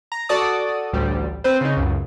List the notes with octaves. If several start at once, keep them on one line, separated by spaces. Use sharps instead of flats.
A#5
F#4 A4 D5 A5 D#6
A1 D2 G3
C4 B4 C5
C#3 D#4
C#2 F#2